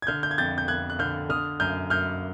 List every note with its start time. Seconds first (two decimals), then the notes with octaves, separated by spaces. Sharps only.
0.02 G#6
0.07 D3 F6 G6
0.23 G6
0.31 G#6
0.38 F2 G6 A6
0.58 G6
0.68 F2 F#6 G#6
0.90 F#6
0.99 D3 F6 G6
1.29 D3 D#6 F6
1.60 F#2 F6 G6
1.90 F#2 F6 G6